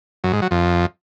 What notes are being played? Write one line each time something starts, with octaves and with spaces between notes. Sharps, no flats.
F#2
G#2
F#3
F2